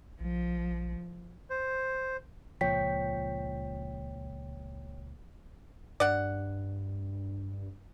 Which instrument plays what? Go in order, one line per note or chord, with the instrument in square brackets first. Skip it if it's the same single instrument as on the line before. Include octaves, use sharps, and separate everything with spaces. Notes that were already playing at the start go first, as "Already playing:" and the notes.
[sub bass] A#1 [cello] F3
[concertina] C5
[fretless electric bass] C#2 A#2 F3 [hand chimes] C#5 G5 B6
[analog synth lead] G2 [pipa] D5 F#5